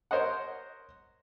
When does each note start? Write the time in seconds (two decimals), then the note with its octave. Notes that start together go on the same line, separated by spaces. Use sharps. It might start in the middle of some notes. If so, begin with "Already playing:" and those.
0.11 A#4 C5 C#5 D#5 F#5